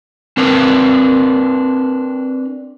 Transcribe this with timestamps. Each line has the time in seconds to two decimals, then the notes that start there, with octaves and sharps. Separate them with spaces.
0.37 C4 D4 A#4 B4